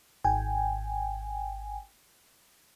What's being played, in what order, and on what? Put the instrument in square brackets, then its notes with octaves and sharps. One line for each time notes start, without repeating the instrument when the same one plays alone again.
[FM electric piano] G#1 G5 G#5